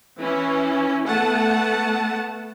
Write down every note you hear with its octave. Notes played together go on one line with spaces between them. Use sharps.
E3 C#4 E4
A3 B3 F#5 A5